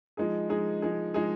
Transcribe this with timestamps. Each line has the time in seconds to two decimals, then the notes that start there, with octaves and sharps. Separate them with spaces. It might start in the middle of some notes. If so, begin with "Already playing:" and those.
0.17 F3 G#3 D#4 G#4
0.49 F3 G#3 D#4 G#4
0.82 F3 G#3 D#4 G#4
1.14 F3 G#3 D#4 G#4